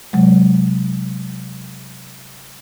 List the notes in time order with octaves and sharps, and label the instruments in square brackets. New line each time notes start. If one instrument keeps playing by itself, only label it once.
[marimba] C3 F#3 G#3